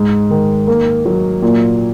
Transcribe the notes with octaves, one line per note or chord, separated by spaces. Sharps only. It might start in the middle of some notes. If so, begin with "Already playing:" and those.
Already playing: G#2
D#3
A#3
F#3
A#2